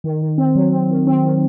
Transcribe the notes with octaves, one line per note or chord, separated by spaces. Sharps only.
D#3
D#3
C4
F#3
C4
D#3
C4
D#3